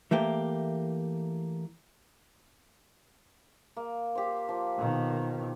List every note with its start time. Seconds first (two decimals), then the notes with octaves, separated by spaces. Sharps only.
0.11 E3 A3 A#3 G4
3.76 A#3
4.15 G4 C5
4.49 F3
4.78 B2 D#3